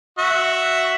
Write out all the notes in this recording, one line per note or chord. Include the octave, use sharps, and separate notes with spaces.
F#4 E5